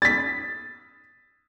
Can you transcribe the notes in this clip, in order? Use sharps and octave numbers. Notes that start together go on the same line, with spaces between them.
A6 B6